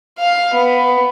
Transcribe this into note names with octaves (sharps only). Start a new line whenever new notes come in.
F5
B3